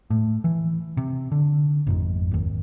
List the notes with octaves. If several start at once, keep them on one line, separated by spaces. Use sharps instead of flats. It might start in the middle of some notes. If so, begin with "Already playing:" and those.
A2
E3
C3
D3
G#1 F2 G#2
G#1 D#2